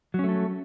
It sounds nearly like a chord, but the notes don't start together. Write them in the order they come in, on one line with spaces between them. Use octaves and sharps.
F#3 C#4 A3 A4